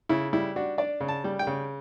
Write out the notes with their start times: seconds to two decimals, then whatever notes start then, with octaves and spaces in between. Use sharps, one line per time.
0.09 C#3 E4
0.33 G3 E4
0.56 D4 F#4
0.78 D4 D5
1.01 C#3
1.08 A5
1.24 G3
1.39 G5
1.47 C#3